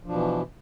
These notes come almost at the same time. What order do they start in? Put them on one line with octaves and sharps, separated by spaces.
F3 D4 B2 E3